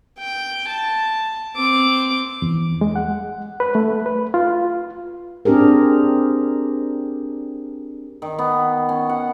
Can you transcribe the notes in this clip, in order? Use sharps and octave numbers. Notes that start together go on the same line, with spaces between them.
G5
A5
C4 D6
E2
G#3
F#5
B4
A3
B4
F4
C4 D4 G4 G#4 A#4
D#3
B3
C#4
F#5